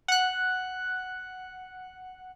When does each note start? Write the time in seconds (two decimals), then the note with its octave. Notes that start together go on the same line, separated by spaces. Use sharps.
0.08 F#5 F#6